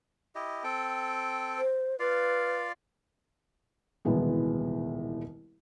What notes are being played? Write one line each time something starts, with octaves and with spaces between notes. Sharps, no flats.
E4 G4 D#5
C4 A4 G5
C5
F4 B4 D5 F5
D#1 C2 B2 E3 G#3 B3